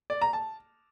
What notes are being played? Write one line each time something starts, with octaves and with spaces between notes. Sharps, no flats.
D5
A#5
A5